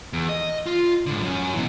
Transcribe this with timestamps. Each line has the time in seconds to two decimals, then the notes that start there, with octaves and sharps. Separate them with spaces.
0.13 E2
0.29 D#5
0.66 F4
1.06 G#2 D3
1.22 F#2 C#4
1.54 B2 E3